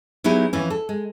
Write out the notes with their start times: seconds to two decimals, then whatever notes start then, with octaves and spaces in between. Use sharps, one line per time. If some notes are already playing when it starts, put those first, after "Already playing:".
0.24 F#3 B3 D#4 E4 G4 G#4
0.53 F2 E3 C#4
0.70 A4
0.89 G#3